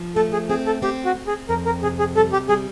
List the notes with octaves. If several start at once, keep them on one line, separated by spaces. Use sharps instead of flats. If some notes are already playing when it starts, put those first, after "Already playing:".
Already playing: F3
A3 A4
G#4
C4 G#4
A4
C4 G4
F#4
C4
G#4
F2 A#4
A#4
C3 G#4
G#4
G3 A4
G4
G3 G#4